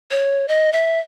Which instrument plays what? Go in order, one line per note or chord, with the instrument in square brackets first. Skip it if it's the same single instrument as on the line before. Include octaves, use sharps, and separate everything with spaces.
[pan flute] C#5
D#5
E5